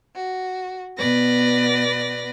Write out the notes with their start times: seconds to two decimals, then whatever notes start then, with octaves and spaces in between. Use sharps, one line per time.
0.16 F#4
0.99 B2 B3 B4 D5 A#6